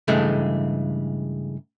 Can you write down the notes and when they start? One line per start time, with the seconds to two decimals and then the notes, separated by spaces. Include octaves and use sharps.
0.08 G2 C#3 E3 G#3 A3